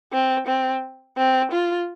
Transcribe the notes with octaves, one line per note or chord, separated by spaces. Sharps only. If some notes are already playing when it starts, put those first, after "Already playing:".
C4
C4
C4
F4